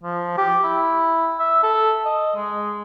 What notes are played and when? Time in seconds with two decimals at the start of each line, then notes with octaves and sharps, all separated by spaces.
0.03 F3
0.37 G4
0.64 E4
1.39 E5
1.63 A4
2.05 D#5
2.35 G#3